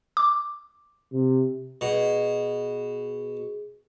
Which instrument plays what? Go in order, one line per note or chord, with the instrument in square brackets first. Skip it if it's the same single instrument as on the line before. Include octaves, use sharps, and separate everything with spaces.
[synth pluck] D6
[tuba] C3
[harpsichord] B2 [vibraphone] G#4